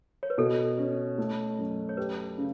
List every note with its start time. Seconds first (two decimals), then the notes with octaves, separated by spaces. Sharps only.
0.23 C#5
0.30 B4
0.38 B2 A4
0.78 C#4
1.18 A3
1.58 F#2
1.89 C#5
1.97 G4 B4
2.38 C#3